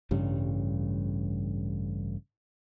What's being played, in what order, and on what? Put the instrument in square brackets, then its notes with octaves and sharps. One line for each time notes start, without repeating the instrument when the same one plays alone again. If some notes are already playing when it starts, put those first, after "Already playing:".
[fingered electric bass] A1 G2 C#3 G3